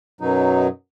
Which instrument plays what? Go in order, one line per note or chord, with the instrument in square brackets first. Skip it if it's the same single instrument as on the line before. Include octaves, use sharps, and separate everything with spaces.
[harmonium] F#2 B2 F#3 D#4